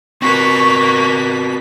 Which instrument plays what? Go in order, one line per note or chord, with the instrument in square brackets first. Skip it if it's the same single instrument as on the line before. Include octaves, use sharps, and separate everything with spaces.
[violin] A#3 B6 [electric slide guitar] C4 F#4 B4 [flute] C#6